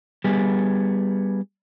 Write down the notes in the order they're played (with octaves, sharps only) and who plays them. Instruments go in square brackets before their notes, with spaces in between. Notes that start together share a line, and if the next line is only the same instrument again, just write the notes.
[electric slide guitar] G3 B3 G#4